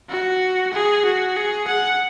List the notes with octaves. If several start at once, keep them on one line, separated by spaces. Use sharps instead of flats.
F#4
G#4
F#4
G#4
F#5